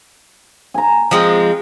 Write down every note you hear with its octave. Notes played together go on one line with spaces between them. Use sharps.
G#5 A#5
F3 G#3 C4